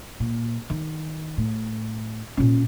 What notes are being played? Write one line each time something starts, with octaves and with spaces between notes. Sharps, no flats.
A#2
D#3
A2
A#2 C#4